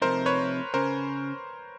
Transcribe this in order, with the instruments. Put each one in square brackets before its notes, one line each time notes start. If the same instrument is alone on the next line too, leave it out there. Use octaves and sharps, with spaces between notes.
[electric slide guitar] C3 F3 A3 C4 D#4 [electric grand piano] A#4 C5
[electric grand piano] B4 C#5
[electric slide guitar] C#3 C#4 [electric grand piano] A#4 C5